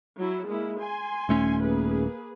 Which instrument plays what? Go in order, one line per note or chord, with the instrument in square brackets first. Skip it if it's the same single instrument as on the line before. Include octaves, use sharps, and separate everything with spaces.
[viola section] F#3 E4
G#3 A#3 E4
G#5 C6
[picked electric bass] D#1 A3 C#4
[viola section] A#3 G#4 B4